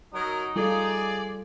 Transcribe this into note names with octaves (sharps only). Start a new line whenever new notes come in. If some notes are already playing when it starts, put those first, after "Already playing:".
F#3 D#4 A#4
G3 F4 G#4 A4 D5